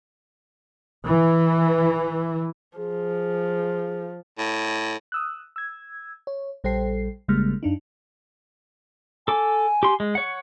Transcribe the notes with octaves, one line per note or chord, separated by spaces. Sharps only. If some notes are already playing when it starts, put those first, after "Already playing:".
E3
F3 G#4
A2
D#6 E6 F#6
E6 G#6
C#5
A#1 G3 A4 C5 G5 C7
A1 C#3 G3 G#3 A#3 F6
F#2 D4 D#4
A4 G#5 D6
G4 C6
G#3
C#5 F#5